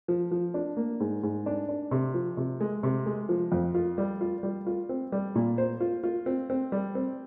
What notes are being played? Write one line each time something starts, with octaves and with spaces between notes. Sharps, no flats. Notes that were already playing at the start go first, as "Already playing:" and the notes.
F3
F3
D4
A#3
G#2
G#2
D4
D4
C3
F3
C3
G#3
C3
G#3
F3
F2
F4
G3
F4
G3
F4
C4
G3
A#2
C5
F4
F4
C4
C4
G3
C4